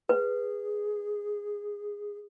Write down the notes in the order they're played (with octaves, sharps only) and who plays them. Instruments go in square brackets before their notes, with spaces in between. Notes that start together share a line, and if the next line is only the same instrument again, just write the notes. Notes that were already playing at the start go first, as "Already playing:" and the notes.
[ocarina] G#4 [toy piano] B4